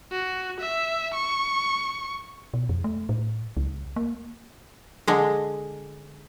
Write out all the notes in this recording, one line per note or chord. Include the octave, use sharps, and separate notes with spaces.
F#4
E5
C#6
B2
F2
A3
A2
C#2
A#3
D3 G#3